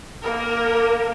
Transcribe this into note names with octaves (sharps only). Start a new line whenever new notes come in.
A#3 A#4